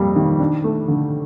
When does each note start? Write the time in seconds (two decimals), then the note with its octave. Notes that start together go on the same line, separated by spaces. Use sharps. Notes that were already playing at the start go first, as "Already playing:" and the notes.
Already playing: F2 G3 A#3
0.16 D#3
0.40 D4
0.64 A3
0.88 D3